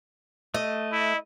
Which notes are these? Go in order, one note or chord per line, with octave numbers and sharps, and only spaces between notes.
A3 D#5
E4